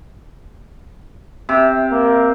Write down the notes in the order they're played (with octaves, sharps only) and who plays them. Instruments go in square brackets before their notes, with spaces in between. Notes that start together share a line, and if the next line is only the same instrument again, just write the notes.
[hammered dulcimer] C3
[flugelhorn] A#3